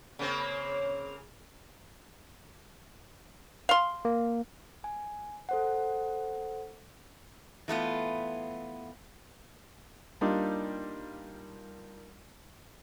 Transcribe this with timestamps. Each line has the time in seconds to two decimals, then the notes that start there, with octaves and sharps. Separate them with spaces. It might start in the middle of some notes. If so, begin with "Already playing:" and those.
0.19 C#3 A#3 C4
3.69 F5 C6
4.05 A#3
4.84 G#5
5.49 A4 C5 F#5
7.68 E3 A3 B3 F4
10.21 G3 A#3 D4 D#4 F4